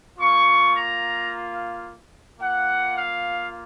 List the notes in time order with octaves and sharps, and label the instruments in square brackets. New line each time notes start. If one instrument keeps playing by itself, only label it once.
[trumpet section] A#3 F4 C#6
A#5
A#3 F4 F#5
F5